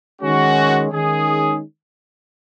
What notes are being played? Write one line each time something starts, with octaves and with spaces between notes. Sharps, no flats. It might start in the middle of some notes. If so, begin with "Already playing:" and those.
D#3 G#3 C#4 F#4
D#3 G#3 C#4 G#4